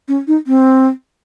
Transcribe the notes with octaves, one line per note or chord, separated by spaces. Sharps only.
C#4
D#4
C4